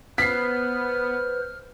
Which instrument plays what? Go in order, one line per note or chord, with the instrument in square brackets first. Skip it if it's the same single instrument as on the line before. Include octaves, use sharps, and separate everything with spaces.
[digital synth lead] B3 [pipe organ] B4 C5 [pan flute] F6 [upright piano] B6 C7